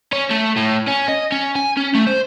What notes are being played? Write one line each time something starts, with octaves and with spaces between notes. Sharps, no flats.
C#4
A3
A2
C#4
D#5
C#4
G#5
C#4
A3
C5